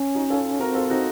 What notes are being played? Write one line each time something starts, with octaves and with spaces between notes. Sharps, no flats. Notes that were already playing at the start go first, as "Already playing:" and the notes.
Already playing: C#4
D#4 F#4
F4 A4
C4 F#4 A#4
F4 A4
D#4 F#4